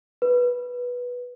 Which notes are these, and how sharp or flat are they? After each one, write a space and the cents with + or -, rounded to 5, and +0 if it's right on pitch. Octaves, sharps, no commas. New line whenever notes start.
B4 -10